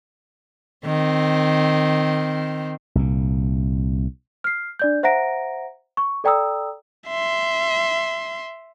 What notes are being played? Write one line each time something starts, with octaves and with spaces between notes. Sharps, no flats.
D#3 C4
C2 A#2
F6 C7
D4 D5 G6
C5 E5 F#5 A#5 A#6 D7
C#6
A4 D5 G5 A#5 D#6 E6
E5 C6